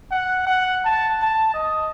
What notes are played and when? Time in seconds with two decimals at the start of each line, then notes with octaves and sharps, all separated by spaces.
0.11 F#5
0.47 F#5
0.85 A5
1.22 A5
1.54 D#5